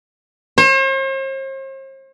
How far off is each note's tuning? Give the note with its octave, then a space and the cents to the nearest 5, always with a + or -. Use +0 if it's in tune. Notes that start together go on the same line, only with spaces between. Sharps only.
C5 +45